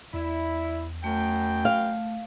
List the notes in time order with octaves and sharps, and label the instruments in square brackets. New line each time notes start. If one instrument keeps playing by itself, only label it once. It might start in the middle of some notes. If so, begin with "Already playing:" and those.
[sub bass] E2 [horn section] E4 [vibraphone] D5 E5
[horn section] F#2 G5 [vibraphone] A3
[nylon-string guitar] F5